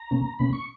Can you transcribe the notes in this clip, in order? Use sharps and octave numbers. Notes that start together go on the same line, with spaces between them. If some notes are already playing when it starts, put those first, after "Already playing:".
Already playing: A#5
B2 A#3 C#4
B2 A#3 C#4 B5
C#6